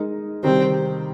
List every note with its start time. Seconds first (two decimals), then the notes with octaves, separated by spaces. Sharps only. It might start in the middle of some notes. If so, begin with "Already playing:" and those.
Already playing: G#3 D#4 A#4 D#5
0.43 C3 D#3 G3 C4